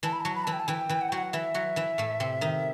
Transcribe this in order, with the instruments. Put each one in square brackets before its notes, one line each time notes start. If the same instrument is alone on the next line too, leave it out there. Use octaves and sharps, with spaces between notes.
[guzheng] E3 E4 [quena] A5
[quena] B5
[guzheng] F#3 F#4 [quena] A5
[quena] B5
[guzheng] E3 E4 [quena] A5
[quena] G5
A5
[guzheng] E3 E4 [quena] G5
[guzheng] E3 E4
[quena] F#5
[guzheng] F#3 F#4 [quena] G5
[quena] F#5
[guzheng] E3 E4 [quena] E5
[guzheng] F#3 F#4
E3 E4
A2 A3
C3 C4
D#3 D#4